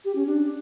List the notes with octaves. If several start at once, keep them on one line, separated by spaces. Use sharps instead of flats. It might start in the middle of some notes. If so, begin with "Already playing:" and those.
G4
C#4
D4